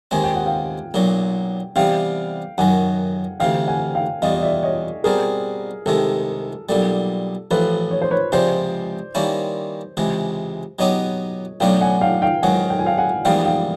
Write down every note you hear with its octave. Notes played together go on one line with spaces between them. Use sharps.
D#2 D#3 G#3 C4 G#5
G5
F#5
F5 G5
B1 A#2 F#3
C3 E3 G3 B3 F5 G5
F#2 D#3 F#3 F#5 G#5
D2 C3 E3 F5 G5
F#5 G#5
F5 G5
E2 B2 G3 D#5 F5
D#5
D5 E5
C#5 D#5
B2 G3 C4 G#4 A#4
C2 C3 D#3 G#3 A4
B1 A#2 G3 A4
A1 A2 F3 A4 B4
C#5
C5
B4 C#5
C#2 C3 F3 G#3 C4 C5 D5
D#3 G3 A#3 C#4 E4
C#2 C3 E3 G#3
B2 F#3 B3 D#4 G4 C#5 D#5
B1 A2 F#3 B3 D4 F5 G5
F#5 G#5
F5 G5
F5 G5
G#2 D#3 F#3 F#5 G#5
G5
G#5
F5 G5
F#5 G#5
A#1 G#2 E3 G3 B3 F5 G5
F5 G5